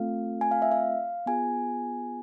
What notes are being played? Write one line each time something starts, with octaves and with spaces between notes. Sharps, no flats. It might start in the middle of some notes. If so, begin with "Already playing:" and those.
Already playing: A3 C4 F4 A4 F5
G#5
F5
E5
F5
B3 F4 G#4 G#5